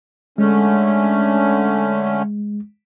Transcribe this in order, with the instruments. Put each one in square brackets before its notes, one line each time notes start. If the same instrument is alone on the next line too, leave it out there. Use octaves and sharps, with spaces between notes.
[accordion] D3 A3 C#4 [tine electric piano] G#3